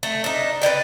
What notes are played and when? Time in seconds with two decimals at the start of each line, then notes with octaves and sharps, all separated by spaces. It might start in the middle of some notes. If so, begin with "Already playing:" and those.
0.03 A3
0.24 D4 D#4
0.62 B4 C#5 D5 G5